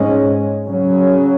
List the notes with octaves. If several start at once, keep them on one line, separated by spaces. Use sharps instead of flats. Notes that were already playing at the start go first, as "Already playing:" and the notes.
Already playing: G#2 G#3 C#4
C#3 F#3 C#4